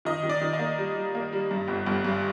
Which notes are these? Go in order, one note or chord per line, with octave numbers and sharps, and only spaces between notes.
D#3 D#5
D#3
D5
D#3
D#5
A#3
G3
G3
A#3
G3
G2
G1
G1
G2